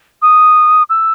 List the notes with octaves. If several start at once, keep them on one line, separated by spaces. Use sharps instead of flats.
D#6
E6